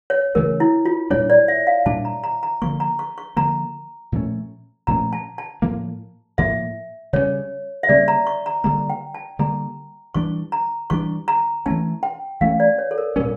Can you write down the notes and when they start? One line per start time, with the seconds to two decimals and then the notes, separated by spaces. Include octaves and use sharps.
0.10 C#5
0.35 C#3 E3 A3 A#4
0.60 E4
0.85 F4
1.10 A#2 G3 D4 C#5
1.30 D5
1.48 E5
1.67 F5
1.86 A#2 G3 D4 A5
2.05 A#5
2.24 A#5
2.43 A#5
2.62 D3 F3 A#3 C#6
2.80 A#5
2.99 C#6
3.18 C#6
3.37 D3 F3 A#3 A#5
4.12 A#2 F3 A3 C#4
4.87 A#2 F3 A3 C#4 A#5
5.13 A5
5.38 A5
5.62 A2 F3 A#3
6.38 A2 F3 A#3 E5
7.13 C#3 G3 A#3 C#4 C#5
7.83 E5
7.89 C#3 G3 A#3 C#4 D5
8.08 A#5
8.27 C#6
8.46 A#5
8.64 D3 G3 A#3 A#5
8.90 G5
9.14 A5
9.39 D3 G3 A#3 A#5
10.14 E3 G3 D4 C#6
10.52 A#5
10.90 E3 G3 D4 C#6
11.28 A#5
11.66 E3 A3 C#4 A5
12.03 G5
12.41 E3 A3 C#4 F5
12.60 D5
12.78 C#5
12.91 A4
12.98 A#4
13.16 A#2 G3 C#4 A#4